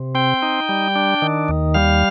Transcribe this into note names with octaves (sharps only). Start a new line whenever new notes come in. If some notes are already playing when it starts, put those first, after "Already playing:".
Already playing: C3
C4 G5
D#4
G3
D4
D#3
D#2
G3 F5